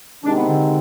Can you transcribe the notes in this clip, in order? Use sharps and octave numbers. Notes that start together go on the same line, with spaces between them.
C3 D#3 G#3 C4 D4 D#4
B3
D3